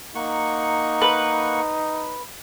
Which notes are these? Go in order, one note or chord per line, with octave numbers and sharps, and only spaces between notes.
A#3 D#4 F#5 C#6
B4